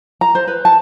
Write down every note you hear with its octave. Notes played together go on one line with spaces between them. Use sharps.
A#5
C5
B4
A5